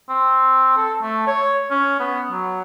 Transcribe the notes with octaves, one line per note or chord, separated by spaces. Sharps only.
C4
A4
A3
C#5
C#4
B3
F#3